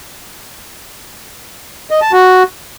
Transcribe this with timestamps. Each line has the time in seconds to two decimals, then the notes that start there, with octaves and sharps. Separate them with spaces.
1.91 D#5
2.02 A5
2.13 F#4